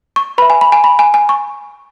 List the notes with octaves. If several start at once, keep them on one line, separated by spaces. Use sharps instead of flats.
C#6
B4 E5 B5
G#5
B5
G#5
B5
G#5
G#5
C#6